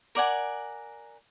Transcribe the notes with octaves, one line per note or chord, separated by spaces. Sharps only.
A#4 D5 F#5 G#5